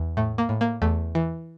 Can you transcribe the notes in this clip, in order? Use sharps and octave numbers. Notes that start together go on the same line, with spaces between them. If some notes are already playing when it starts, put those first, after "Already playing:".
Already playing: E2
A2 A3
A#3
A2
A#3
E2 A3
E3